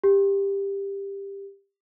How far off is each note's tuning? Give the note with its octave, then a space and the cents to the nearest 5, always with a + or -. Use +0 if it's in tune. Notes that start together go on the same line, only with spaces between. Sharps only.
G4 +15